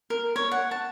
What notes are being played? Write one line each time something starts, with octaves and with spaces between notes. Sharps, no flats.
A#4
C#5
F#5
A5